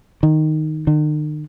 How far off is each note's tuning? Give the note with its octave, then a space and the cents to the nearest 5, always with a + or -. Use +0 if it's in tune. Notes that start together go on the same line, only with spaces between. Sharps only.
D#3 -5
D#3 -45